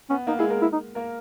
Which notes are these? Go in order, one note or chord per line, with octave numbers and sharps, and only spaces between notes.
B3 C#4
A#3 D#4
G#3 E4 G#4
A#3 A#4
E4
D#4
A#3 A#4